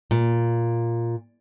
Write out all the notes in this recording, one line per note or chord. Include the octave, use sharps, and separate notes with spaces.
A#2